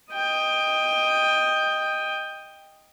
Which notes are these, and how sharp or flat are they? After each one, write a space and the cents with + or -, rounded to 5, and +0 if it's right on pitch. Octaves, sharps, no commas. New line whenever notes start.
D#5 +0 G5 +15